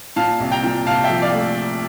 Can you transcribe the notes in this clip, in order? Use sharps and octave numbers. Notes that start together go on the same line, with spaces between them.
A#2 F5 A5
C2
G5 A#5
A#2
C2 F5 A5
E5 G5
F3
D5 F5
A3